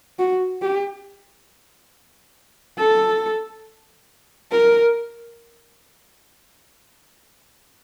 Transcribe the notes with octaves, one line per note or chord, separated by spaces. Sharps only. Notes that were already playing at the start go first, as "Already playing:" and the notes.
F#4
G4
A4
A#4